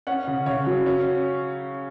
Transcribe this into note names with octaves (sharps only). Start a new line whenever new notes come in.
C#4 F#5
C#3
C#3 C#5
F#3
C#4